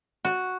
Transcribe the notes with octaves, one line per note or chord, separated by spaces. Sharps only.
F#4